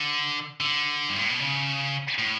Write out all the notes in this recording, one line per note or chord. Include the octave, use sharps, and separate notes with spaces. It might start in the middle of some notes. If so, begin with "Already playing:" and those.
Already playing: D3
D3
G2
A2
B2
C#3
A2